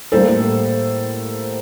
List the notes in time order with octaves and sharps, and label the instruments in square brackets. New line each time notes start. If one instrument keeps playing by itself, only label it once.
[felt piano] A2 G3 A#3 A4 C5